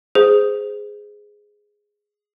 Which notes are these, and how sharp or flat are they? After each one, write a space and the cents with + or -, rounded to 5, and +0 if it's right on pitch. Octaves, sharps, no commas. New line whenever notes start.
G#4 +0 C5 -20